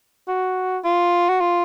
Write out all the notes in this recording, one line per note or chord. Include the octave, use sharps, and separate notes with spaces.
F#4
F4
F#4
F4